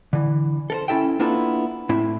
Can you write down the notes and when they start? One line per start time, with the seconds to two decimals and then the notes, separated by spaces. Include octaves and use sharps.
0.13 D3 E3
0.70 A4 A#4 C5
0.88 C#4 E4 A4 E5 G5
1.19 A#3 B3 D4 E4 F4 A4
1.89 A2 C4 E4 E5